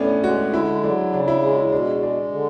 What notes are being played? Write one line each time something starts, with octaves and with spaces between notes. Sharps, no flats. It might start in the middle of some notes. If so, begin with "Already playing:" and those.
Already playing: A2 B3 C#4 D4
G#3 F#4
D3 E4
F#3 D4
C#3 D4
E4
G#3
E4
B2 D4
G#3 D4
D3